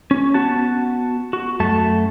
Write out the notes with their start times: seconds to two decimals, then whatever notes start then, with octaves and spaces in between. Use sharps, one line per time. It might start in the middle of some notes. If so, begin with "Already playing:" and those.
0.11 C#4
0.34 B3 F#4 A5
1.33 F#4
1.60 F#2 A3 A5